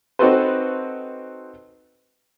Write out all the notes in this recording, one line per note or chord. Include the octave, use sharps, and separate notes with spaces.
C4 D#4 F#4 A4 B4 C5